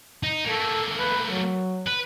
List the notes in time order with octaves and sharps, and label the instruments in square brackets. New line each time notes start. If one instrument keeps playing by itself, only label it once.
[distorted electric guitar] D#4
[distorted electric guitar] A3 A#3 [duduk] A4
[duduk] B4
F#3
[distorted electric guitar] B4